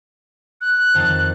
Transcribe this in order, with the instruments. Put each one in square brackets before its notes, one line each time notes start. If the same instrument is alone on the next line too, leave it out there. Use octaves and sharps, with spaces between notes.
[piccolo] F#6
[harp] F2 D#3 A5